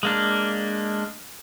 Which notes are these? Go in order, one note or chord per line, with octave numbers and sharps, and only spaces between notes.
G#3 A#3 D4